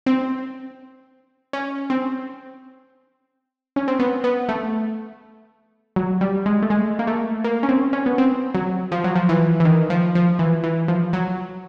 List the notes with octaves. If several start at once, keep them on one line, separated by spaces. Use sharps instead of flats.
C4
C#4
C4
C#4
C4
B3
B3
A3
F#3
G3
G#3
A3
G#3
A#3
A3
A#3
C#4
C4
C#4
B3
C4
F#3
F3
F#3
F3
E3
E3
D#3
F3
F3
E3
E3
F3
F#3